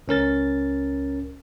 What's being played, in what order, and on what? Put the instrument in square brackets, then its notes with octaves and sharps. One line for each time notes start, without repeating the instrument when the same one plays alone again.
[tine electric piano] C#2 C#4 A#4 A6